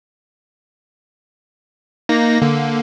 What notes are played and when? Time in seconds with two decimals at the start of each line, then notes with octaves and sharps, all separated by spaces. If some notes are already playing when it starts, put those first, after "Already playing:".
2.09 A#3 D#4 A#6
2.42 D3 A#3